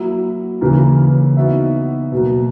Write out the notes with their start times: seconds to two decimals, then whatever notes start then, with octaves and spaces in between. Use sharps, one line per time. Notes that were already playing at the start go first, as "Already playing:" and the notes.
Already playing: F#3 A#3 E4
0.61 C#3 E3 A#3
1.37 B3 D#4 F#4 B4 E5
2.12 B2 F#3 A#3